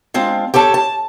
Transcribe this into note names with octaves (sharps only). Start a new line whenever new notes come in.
G#3 C4 D4 F4
G4 A4 C#5 A5
A5